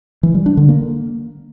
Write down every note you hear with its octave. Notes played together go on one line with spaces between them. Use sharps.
E3
G3
D4
D3
A#3